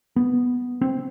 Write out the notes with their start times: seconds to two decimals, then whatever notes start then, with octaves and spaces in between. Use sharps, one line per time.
0.16 B3
0.81 C4